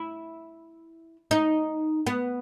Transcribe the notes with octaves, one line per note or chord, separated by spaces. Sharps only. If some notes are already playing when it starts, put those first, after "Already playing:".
Already playing: E4
D#4
B3